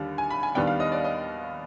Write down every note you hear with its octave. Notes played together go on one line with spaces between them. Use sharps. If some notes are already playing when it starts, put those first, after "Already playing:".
Already playing: D#2 D3 G3
G#5
B5
G#5
D#2 D#3 G3 B3 D4 G5
F5
D#5
D5
D#5